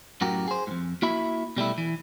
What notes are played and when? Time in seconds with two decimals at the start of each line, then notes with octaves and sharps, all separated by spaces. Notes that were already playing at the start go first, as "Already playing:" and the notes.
0.21 F#2 A2 F#4 G4 A#4
0.48 G#4 C5
0.67 F2 G#2
1.02 A#3 E4 F#4 E5 B5
1.57 B2 G3 A3 E4
1.78 E3